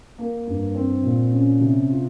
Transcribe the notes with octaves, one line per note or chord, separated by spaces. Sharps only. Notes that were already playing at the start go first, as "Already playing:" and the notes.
A#3
G2
C4
A#2
C#4
C3
F4